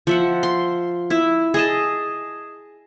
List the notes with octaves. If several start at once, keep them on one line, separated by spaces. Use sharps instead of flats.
F3 E5 F#5
C6
E4 E5
G#4 D#5 A5